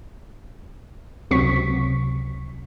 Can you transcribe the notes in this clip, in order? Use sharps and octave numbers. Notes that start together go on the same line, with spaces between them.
C#2 C3 F#3 C4 C#6 B6